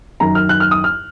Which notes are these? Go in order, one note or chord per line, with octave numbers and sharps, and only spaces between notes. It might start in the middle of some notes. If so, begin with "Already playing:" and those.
F#2 D#3 A#5
F6
F#6
F6
D#6
F6